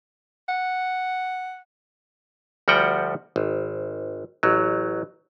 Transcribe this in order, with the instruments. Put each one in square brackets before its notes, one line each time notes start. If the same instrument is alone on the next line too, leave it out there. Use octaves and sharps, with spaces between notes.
[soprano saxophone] F#5
[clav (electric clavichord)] D2 F3 G3 F#4 F#5 G5
G#1
A1 F#3